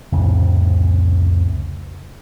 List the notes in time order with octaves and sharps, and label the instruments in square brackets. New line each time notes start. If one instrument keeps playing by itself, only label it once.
[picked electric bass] C2 F2 A2 C#3